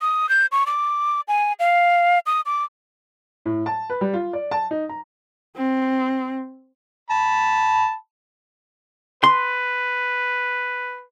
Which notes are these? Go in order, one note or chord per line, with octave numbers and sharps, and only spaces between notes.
D#6
G6
C#6
D6
G#5
F5
D#6
D6
A2
A5
B4
G3
F4
D5
A5
D#4
A#5
C4
A5 B5
B4 C6